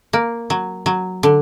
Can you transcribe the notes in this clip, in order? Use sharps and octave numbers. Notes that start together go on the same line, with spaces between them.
A#3
F#3
F#3
D3